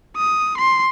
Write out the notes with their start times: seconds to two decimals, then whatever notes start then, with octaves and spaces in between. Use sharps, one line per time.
0.17 D#6
0.58 C6